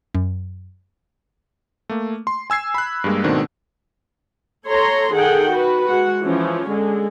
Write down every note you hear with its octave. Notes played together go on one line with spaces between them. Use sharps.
F#2
A3 A#3
C6
G#5 E6 G#6 C7
B5 F#6
G2 G3 G#3 A#3
G#2 B2 D#3 A3 C4 D4
A4 C#5 A#5 C6
D#3 G#4 A4 F#5 G5
F#4 B4
G#3 F#4 F#5
E3 F3 C#4
D3 G#3